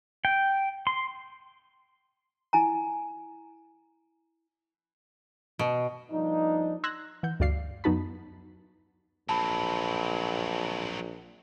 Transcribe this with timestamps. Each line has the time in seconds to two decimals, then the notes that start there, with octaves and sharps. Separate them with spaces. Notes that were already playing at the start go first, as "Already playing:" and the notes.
0.25 G5
0.87 C6
2.53 E4 G#5 A#5
5.59 B2
6.11 G2 F3 A#3 D4 D#4
6.84 C6 E6 F#6 G#6 A#6
7.23 E3 F#5 G6
7.40 D2 G2 F#4 D5 F5 C7
7.84 F#2 B3 D#4 F#4 A5 B5
9.29 A#1 F#3 C4 A5 B5